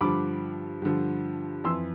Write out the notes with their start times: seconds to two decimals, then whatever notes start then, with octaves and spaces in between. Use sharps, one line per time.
0.01 G2 D3 F3 B5 D6
0.82 G2 D3 F3
1.64 F2 E3 C6 E6